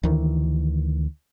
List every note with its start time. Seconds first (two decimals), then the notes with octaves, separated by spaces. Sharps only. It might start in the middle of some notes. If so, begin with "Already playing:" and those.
0.03 D2 D#3 E3